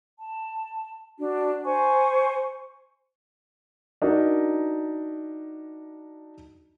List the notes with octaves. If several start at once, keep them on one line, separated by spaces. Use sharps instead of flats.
A5
D4 F#4
C5 G#5 C#6
D4 D#4 F#4 A#4